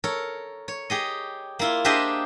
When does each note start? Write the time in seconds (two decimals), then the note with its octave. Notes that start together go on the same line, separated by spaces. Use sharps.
0.04 A4 A#4 C#5
0.68 C#5
0.90 G4 G#4 D#5
1.59 A#3 E4 F4
1.85 D4 G4 G#4 C5 D#5 E5